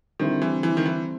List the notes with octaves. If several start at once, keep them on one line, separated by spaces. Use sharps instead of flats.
D3 D#3 G3 C4 E4
E3
E3
D#3
E3